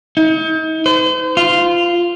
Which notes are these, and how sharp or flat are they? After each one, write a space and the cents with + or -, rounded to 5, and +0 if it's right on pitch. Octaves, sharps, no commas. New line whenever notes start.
D#4 +40
C5 -40
F4 -5